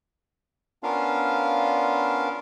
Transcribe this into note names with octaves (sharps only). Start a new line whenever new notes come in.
B3 C#4 D4 F4 A#4 F5